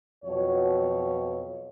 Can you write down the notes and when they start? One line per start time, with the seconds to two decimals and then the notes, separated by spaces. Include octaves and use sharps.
0.24 F2 B2 F#3 C#5